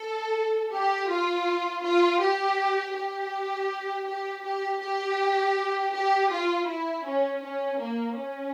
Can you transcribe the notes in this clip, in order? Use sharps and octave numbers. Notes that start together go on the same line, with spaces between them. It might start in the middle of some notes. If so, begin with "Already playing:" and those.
Already playing: A4
G4
F4
F4
G4
G4
G4
G4
G4
G4
F4
E4
C#4
C#4
A#3
C#4